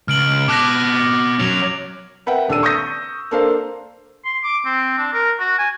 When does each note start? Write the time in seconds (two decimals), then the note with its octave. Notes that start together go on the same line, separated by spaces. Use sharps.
0.08 C#2 F6 D7 F#7
0.48 B2 A5 D6 F#6 A#6
1.39 F#3 C#4 F7
2.26 A#4 B4 E5 F#5 G5
2.48 D#1 D4 A4 E6 D#7
2.63 C#6 D#6 E6 G6 A#6
3.31 A#3 D4 A4 C5 F5
4.25 C6
4.43 D6
4.65 C4
4.98 D4
5.13 A#4
5.39 F#4
5.58 G#5